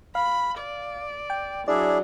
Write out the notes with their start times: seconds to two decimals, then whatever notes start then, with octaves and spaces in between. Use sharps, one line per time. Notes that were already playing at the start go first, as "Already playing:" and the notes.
0.15 F5 B5
0.58 D5
1.30 G5
1.68 F#3 D4 E4 G#4 D5